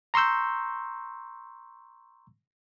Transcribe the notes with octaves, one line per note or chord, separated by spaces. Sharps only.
A#5 C6 C#6 E6 G6